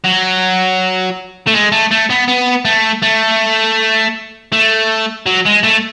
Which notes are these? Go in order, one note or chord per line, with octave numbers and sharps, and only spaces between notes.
F#3
A3
G#3
A3
A3
B3
B3
A3
A3
A3
F#3
G#3
A3